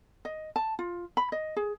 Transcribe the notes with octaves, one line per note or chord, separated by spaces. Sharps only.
D#5
A5
F4
B5
D#5
G#4